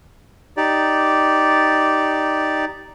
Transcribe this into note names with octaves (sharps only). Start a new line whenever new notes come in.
D#4 G4 D5